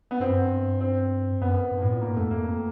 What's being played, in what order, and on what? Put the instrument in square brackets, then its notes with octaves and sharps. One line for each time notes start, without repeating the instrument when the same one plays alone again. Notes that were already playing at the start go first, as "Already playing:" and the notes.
[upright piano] B3
[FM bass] G2 [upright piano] C4
[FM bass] F#2
G2
[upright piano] C4
[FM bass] F#2 [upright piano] B3
[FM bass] G2
A2
A#2
[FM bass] G#2 [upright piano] A#3
[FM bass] F2 [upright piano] A3
[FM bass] F2 [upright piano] A#3